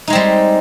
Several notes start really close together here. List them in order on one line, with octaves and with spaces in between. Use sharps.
D#4 G#3 C4 G3